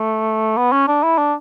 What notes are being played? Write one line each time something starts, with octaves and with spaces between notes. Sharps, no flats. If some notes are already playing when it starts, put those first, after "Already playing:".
Already playing: A3
B3
C#4
D4
E4
D4